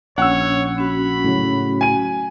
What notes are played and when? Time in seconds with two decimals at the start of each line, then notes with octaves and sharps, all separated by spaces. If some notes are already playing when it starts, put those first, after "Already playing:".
0.18 A#1 C#4 C#5 F#5 E6
0.78 C#4 F#4 B5
1.24 A2 C#3 F#3
1.81 G#5 D#7